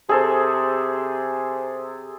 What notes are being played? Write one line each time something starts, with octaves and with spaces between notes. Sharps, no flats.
C3 G#4 A4 C5